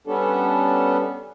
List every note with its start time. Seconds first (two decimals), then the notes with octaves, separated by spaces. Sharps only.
0.07 G3 B3 C#4 D4 A4